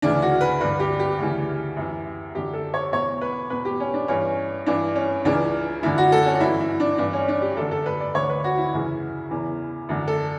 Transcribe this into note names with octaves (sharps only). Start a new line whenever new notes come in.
D2 C#3 E3 D4
F#4
B4
G2 D3 B4
G4
G4
D2 C#3 E3
F#2 E3
F#2 D3 G4
A4
C#5
E2 B2 C#5
B4
E2 B2 B4
G4
C#4
D4
G2 E3 C#4
G2 E3 D4
C#4
C#2 C#3 E3 D4
F#2 D3 E4
F#4
A4
C#4
F#4
G2 E3 E4
E4
D4
G2 E3 D4
C#4
D4
G4
F#2 D3 A4
A4
B4
D5
D2 D3 C#5
B4
F#4
E4
F#2 C#3 E3
E2 C#3 E3
F#2 D3
A4